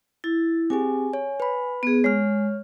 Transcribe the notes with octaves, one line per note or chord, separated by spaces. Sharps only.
E4 A6
C4 G4 G#4 G#5
C#5
B4 B5
B3 G#4
G#3 C#5 F6